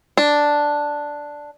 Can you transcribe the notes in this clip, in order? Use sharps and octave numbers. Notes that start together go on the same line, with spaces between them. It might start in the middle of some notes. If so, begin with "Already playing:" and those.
D4